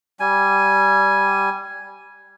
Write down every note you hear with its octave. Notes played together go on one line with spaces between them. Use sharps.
G3 G#5